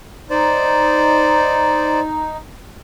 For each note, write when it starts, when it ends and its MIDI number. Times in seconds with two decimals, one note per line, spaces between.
0.30 2.37 63
0.30 2.00 72
0.30 2.00 74